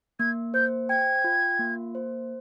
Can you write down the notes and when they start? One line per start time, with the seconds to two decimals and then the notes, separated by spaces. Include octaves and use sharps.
0.20 A#3 G#6
0.54 C5 G6
0.89 G5 G#6
1.24 F4
1.59 A#3
1.95 C5